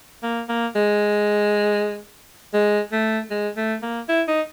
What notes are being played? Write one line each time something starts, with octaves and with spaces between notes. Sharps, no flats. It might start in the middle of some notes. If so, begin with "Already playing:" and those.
A#3
A#3
G#3
G#3
A3
G#3
A3
A#3
E4
D#4